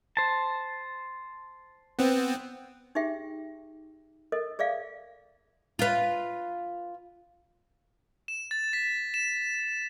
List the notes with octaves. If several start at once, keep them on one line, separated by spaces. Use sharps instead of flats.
C5 A5
B3 C4
D#4 G4 G#4 E5 G5
A4 A#4 D#5
G#4 D5 E5 F5
F4 B4
E7
A6
B6
E7